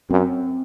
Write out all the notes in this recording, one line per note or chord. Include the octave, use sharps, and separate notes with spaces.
F#2 C4